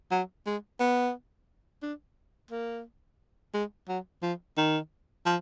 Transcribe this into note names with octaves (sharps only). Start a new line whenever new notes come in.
F#3
G#3
B3
D4
A#3
G#3
F#3
F3
D#3
F3